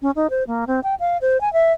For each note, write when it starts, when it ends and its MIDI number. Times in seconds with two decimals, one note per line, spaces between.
0.02 0.11 61
0.16 0.27 63
0.30 0.44 72
0.47 0.65 58
0.67 0.80 60
0.84 0.95 79
1.00 1.18 77
1.21 1.40 72
1.41 1.52 80
1.53 1.73 76